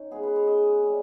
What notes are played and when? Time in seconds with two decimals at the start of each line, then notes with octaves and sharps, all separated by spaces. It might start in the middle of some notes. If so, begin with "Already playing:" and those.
Already playing: C#4 D#4 C#5
0.11 C#3 G#3 B3 G#4
0.23 B4
0.36 C#5
0.47 D#5
0.83 G3 C#4